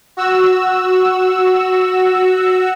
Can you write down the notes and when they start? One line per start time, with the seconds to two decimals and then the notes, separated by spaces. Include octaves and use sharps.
0.17 F#4 E6